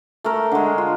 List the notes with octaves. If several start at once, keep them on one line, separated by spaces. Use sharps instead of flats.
A3 A#4
D3 G#3
F4